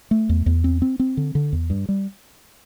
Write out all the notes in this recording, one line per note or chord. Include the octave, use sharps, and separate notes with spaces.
A3
E2
E2
C4
C4
C4
D3
D3
E2
G2
G3